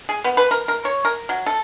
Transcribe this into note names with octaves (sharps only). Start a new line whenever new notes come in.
G#4
B3
B4
A#4
A#4
C#5
A#4
F#3
A4